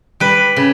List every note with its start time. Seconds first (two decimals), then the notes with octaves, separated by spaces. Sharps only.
0.20 G3 B4
0.56 C#3